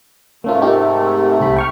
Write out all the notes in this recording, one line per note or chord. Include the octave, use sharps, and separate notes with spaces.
G#2 C3 A3 A#3 C#4 F4
D#4 G4 A#4
C2 G4 B5
G5 C#6 F6